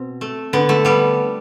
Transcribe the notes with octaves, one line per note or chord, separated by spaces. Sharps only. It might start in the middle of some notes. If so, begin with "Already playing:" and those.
Already playing: B2 C4
A3
D3 B3
A3
G3 B3